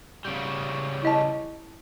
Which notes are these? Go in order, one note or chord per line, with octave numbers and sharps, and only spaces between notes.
C#3 G3
E4 D#5 A5